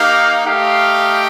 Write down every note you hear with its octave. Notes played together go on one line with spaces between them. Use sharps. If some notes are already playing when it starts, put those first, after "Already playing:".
Already playing: A#3 D#4 G4 F5
A3 D#4 G4 F5